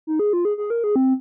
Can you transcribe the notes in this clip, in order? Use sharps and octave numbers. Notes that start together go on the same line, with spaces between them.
D#4
G#4
F4
G#4
G#4
A#4
G#4
C4